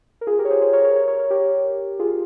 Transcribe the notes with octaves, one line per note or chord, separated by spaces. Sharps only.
A#4
F4 G#4
G4 A#4
C#5
G#4 C5
G#4 C5
A#4 C#5
A#4 C#5
A#4 C#5
A#4 C#5
A#4 C#5
G4 A#4
F4 G#4